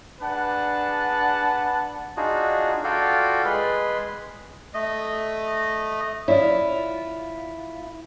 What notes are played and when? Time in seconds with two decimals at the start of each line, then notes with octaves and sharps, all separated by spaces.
0.21 D4 G#4 B4 F#5 A5
2.17 D4 D#4 F4 F#4 G#4
2.84 F4 F#4 A4 D5 F5 G5
3.45 G#3 G#4 B4 B5 C6
4.74 A3 D#5
6.28 E4 F4 C#5 D5